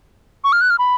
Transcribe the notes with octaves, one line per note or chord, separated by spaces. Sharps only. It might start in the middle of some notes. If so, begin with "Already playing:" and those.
C#6
F6
F#6
F6
B5